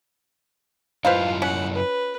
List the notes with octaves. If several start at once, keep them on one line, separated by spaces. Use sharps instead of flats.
F#2 E4 F4 B4 C5 D#5 F5
C#4 F#5
B4